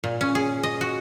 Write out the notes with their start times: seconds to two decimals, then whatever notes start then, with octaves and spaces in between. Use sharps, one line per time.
0.04 A#2
0.21 C#4
0.35 G#4
0.63 D#5
0.81 F#4